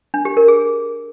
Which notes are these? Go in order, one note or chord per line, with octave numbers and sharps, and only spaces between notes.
D4
G4
A#4
G#4